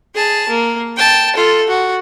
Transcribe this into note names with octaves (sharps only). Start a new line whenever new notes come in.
G#4 A5
A#3
G5 A5
F4 A4
F#4